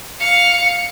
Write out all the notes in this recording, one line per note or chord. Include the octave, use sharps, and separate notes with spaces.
F5 C#7